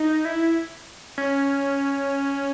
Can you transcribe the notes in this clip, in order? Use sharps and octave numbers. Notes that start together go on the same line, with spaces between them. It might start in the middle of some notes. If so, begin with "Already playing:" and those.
Already playing: D#4
E4
C#4